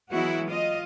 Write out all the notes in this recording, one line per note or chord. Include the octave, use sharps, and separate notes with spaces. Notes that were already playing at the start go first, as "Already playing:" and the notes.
E3 F#3 G#3 B3 E4 F#4
F4 D#5